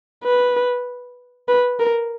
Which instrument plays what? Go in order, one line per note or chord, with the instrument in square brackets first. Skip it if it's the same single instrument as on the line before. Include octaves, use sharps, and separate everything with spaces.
[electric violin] B4
B4
A#4